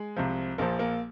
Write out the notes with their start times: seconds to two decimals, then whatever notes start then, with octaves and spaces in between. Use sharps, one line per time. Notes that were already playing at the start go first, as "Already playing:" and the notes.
Already playing: G#3
0.16 C2 C3 F3
0.58 A#1 A#2 F3 A#3
0.79 A#3